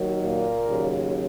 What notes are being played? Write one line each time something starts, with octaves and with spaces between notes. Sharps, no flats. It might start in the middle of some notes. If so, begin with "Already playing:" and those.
Already playing: D#2 D#3 F#3
A#2 A#3
D#2 C#3 F#3